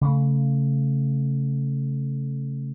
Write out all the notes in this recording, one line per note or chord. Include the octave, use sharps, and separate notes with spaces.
C#3 A3